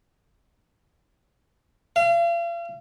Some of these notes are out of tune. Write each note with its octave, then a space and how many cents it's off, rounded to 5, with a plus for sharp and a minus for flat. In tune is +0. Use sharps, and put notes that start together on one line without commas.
F5 -40